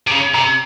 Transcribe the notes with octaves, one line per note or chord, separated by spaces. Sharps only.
C3
C#3 A#5
C3 A#5